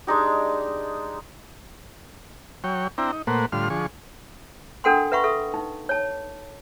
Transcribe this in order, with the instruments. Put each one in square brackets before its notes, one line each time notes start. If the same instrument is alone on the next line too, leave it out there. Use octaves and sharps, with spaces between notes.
[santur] G#3 D4 D#4 G4
[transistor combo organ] F#3 C#5 G5
C4 D4 E4 G5 A#5
D#4
A#2 A3 A#3 B4 C5 F#5
A2 D3 G3 F4 C6 F6
D3 F3 G#4 C#6
[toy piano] D4 A4 A#4 F#5 G5 C6
B4 E5 F#5 B5 C#6
A4 E5
D#4
C#5 A5